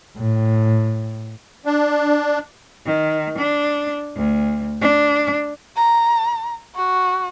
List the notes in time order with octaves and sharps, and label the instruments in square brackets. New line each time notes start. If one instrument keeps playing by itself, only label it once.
[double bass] A2
[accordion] D4
[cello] D#3
D4
D2
D4
[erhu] A#5
F#4